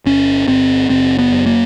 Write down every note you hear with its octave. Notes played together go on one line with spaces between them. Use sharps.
G1 C#4
G1 C4
F#1 C4
B3
F#2
A#3